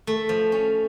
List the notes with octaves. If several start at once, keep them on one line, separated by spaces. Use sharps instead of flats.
A3
F3
C#4